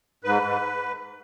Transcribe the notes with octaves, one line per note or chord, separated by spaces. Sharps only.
G#2 B4
G#2